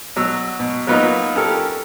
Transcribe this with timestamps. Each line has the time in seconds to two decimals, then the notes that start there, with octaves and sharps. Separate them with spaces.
0.16 B2 F#3 E6
0.60 B2
0.87 F#3 A#3 B3 D#4 F4
1.36 C#4 G4 A4 A#4